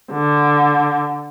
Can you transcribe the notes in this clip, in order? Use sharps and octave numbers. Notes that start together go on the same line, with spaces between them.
D3